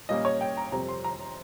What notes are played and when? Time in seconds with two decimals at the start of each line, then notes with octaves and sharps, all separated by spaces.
0.09 A#2 G3 A#3 C#4 D#5
0.25 C#5
0.41 G5
0.57 A#5
0.72 F2 C3 G3 C4 A#5
0.88 C6
1.04 A#5